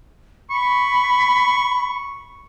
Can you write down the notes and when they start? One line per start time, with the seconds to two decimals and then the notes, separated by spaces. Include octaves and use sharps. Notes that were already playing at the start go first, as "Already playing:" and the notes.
0.50 B5 C#6